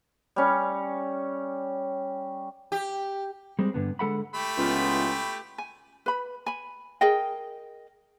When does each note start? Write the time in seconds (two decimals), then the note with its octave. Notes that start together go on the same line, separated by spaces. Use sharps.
0.36 G3 C#4
2.72 G4
3.59 G3 G#3 C4
3.74 G2 D3 B3
3.99 D3 G#3 A4 F#5 B5
4.34 A3 G4 B5
4.58 C#2 E3 B3 F4
5.58 G#5
6.06 B4 B5
6.46 G#5 B5
7.01 G#4 A#4 D#5 G5